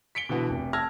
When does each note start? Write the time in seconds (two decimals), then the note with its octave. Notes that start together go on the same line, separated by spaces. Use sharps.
0.15 B6 C#7 D7 G7
0.29 B2 D3 E3 B3 F#4
0.50 F1
0.73 A5 E6 F6 G#6 A#6